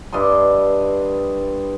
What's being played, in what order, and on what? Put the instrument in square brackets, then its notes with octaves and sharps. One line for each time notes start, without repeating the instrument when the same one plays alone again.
[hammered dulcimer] G2 E4 D#5 C6